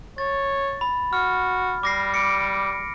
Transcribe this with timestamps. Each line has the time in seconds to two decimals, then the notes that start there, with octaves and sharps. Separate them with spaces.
0.18 C#5 A6
0.81 B5
1.13 F#4 F6
1.83 G3 D6 A#6 C7
2.14 C#7 D7